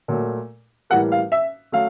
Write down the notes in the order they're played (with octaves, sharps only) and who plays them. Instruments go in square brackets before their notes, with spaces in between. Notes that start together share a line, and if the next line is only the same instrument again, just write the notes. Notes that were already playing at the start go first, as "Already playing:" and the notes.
[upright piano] A#2 F#3 A3
A2 E3 G3 A#3 F#5
F5
E5
F#3 A3 F5